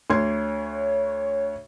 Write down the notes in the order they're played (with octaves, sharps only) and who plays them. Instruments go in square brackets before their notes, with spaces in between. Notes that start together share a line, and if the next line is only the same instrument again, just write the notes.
[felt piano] D2 C6 G#6 [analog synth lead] C#5